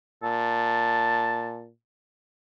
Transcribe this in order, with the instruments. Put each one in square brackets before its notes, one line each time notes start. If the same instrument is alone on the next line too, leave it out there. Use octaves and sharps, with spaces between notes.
[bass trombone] A#2 [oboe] A5